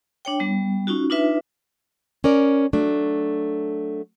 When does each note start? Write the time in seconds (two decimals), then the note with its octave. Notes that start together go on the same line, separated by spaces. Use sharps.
0.25 D4 C#5 G5
0.40 G3 B3
0.87 C#4 D#4 F4 F#4
1.10 D4 D#4 F4 B4 E5
2.24 C#4 A#4 D5
2.73 F#3 A3 D4